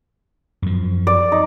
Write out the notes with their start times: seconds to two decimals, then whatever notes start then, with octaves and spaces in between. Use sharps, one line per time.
0.62 F#2 F3
1.07 D5
1.32 D#4